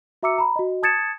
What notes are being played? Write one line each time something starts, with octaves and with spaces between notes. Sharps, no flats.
F#4 E5 A#5 D6 E6 C#7
A#5 B5
F#4 D#5
A5 D#6 G#6 A6 C#7 E7